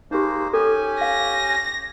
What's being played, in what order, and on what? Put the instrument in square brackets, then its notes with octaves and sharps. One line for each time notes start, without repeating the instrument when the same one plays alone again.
[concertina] G#3 A#3 C5 [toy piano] D#4 G4
[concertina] C#4 G4 G#5 [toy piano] A4
[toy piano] F5 [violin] A#6